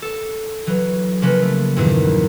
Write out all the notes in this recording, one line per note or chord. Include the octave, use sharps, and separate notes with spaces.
A4
E3 F#3
C#3 F3 A#3 C#4 B4
A3
E2 G2 A#2 D#3 E3 F#3